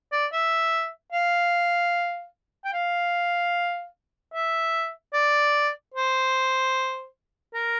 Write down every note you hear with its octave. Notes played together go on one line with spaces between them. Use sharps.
D5
E5
F5
G5
F5
E5
D5
C5
A#4